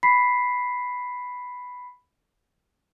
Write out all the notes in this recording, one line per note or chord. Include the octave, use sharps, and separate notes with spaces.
B5 B6 C7